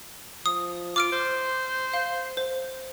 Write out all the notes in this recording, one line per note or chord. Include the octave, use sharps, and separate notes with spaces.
F3 D#6
F4 D6 F6 D7
C5
F5
C5